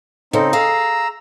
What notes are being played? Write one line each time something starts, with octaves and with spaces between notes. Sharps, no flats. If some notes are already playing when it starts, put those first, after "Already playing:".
C#3 C4 D#4 A4
G#4 F5 A#5 E6